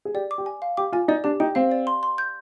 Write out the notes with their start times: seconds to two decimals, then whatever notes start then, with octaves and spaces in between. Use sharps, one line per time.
0.05 G#4
0.14 G4 D5
0.31 D6
0.38 G4
0.46 G#5
0.62 F5
0.77 G4 D6
0.92 F4 G#5
1.08 D#4 D5
1.24 D4 G4
1.40 D#4 G5
1.55 C4 F5
1.72 D5
1.87 C6
2.03 C6
2.18 G6